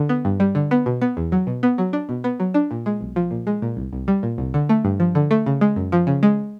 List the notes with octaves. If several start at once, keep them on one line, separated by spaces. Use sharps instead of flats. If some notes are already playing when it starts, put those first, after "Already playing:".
Already playing: D3
B3
G2
G3
D3
B3
B2
B3
E2
F#3
B2
B3
F#3
D4
B2
B3
F#3
D4
A#2
G#3
B1
F3
A#2
G#3
A#2
C2
C2
G3
A#2
C2
D3
A3
G2
F3
D3
A3
C#3
G#3
F#2
F3
C#3
G#3